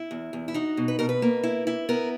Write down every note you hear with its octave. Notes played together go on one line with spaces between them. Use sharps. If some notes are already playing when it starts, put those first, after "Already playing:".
Already playing: E4
E2
E2
E4
D#4 F#4
B2
B4
B2 A#4
B4
A#3
E4
E4
B3 A#4